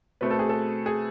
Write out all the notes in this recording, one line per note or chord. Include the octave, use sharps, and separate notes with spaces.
B2 A3 C4 B4
A4
G#4
A4
G#4